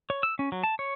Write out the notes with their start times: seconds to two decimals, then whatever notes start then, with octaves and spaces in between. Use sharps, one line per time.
0.10 C#5
0.23 E6
0.39 C#4
0.52 F#3
0.64 A5
0.79 C#5